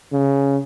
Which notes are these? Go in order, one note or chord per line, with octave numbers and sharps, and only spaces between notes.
C#3